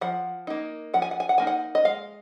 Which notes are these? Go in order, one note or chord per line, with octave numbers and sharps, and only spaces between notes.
F3 F#5
A#3 D#4
F3 F#5
G#5
F#5
G#5
F#5
A#3 D#4 G#5
F#5
D#5
G#3 F5